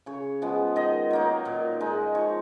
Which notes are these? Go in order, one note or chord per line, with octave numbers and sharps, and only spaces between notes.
C#3 C#5
F3 G#3 B3
D#3 D#5
F#3 A#3 D#4
A#2
G#3 D#4
F3 C#5